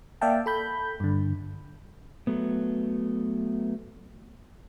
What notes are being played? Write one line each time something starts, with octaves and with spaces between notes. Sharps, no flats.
A#3 D5 E5 F5 G5 A5
A4 B5 G6
G2 D3
F#3 A3 B3